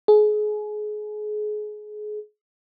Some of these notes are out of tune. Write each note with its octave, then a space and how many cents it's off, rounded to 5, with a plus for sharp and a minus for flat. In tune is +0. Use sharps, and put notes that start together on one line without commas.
G#4 +30